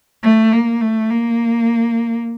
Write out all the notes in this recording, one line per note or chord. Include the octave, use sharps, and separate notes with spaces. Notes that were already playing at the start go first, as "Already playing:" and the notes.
A3
A#3
A3
A#3